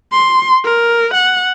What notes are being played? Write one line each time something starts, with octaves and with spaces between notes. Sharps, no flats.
C6
A#4
F#5